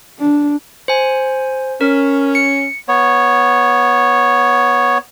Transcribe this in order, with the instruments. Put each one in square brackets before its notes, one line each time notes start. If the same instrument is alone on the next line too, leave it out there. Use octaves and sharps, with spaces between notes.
[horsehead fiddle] D4
[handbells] C5 G#5
[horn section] C#4 [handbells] A#4
[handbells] C#7
[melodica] B3 C#5